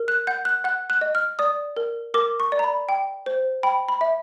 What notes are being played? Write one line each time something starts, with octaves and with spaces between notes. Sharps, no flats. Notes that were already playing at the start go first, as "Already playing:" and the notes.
Already playing: A#4
F#6
F#5 G6
F#6
F#5 F#6
F#6
D#5
F6
D5 D#6
A#4
A#4 D6
C#6
D5
A#5
B5
G5
C5
G5 B5
B5
E5